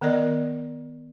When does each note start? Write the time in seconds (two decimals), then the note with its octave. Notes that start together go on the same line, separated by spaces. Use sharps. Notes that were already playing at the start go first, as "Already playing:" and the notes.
0.01 D#3 B3 A#4 D5 D#5